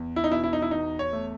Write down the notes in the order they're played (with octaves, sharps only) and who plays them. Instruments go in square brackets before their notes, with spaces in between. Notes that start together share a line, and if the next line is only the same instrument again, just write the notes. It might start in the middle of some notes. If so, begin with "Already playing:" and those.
Already playing: [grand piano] E2
E4
D#4
B2 E4
E4
D#4
E4
E2 D#4
C#5
A3